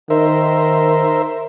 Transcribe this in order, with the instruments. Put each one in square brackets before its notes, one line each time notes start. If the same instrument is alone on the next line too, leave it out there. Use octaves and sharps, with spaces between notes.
[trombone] D#3 [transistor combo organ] A#4 C5 E5